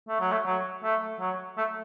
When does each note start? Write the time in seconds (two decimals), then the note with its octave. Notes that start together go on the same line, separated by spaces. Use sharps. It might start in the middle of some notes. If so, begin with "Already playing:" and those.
0.09 A3
0.20 F#3
0.32 A3
0.46 F#3
0.83 A3
1.20 F#3
1.58 A3